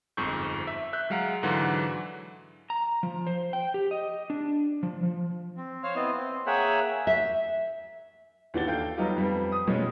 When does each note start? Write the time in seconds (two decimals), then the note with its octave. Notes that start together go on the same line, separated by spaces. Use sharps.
0.17 G1 F2 G#2 C#6 G6
0.67 E5
0.93 E5 F#6 G6
1.10 F#3 G#3 F5 F#5 A#5
1.43 G#2 D3 E3 F#3 F#4
2.70 A#5
3.03 F3
3.27 C5
3.53 G5
3.74 G4
3.91 D#5
4.30 D4
4.83 F3
5.03 F3
5.57 C4
5.83 C5 C#5 F5 F6
5.95 B3 C4 E4 D#5
6.17 C4
6.46 A#3 G#4 C#5 E5 F#5 G5
7.07 E5
8.54 D#2 E3 D4 F#4 A6 G7
8.67 A4 F5 G5 G6
8.97 F#3 G3 B3 D#4 F4 G4
9.16 F2 G3 B3
9.52 D#6
9.67 B2 F3 G3 G#3 C#4